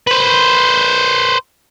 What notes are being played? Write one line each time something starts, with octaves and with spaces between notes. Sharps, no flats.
B4 C5